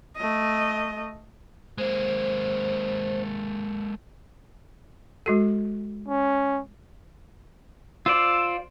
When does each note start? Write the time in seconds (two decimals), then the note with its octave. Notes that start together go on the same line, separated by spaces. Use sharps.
0.17 A3 D#5
1.78 G#3 A#3 C5
5.26 G#3 F#4 A4
6.08 C#4
8.06 F4 C5 D5 E6